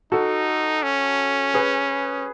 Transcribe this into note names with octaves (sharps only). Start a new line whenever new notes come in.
D#4 F#4 A4
C#4
G#4 B4